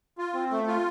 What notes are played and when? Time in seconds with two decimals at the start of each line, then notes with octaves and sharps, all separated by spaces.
0.18 F4
0.34 C4
0.51 A3
0.68 F4